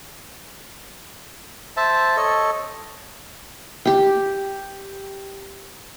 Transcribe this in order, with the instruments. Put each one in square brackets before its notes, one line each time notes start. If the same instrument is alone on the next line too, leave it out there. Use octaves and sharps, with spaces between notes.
[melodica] C5 E5 A5
A4 C#5 D#5
[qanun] G4 G5